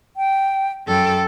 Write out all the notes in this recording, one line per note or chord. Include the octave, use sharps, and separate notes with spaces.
G5
F#2 A4 G5